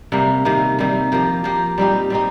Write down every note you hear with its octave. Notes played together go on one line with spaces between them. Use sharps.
C3 G3 A#3
C3 D#3 G3 A#3
C3 D#3 G3 A#3
F3 A#3 G4
F3 A#3 G4
G3 C4 D#4 G4
G3 C4 D#4 G4